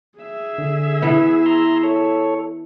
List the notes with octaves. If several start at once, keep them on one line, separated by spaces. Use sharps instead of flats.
G#4 E5
D3
E3 B3
A#5 C6
A4 C#5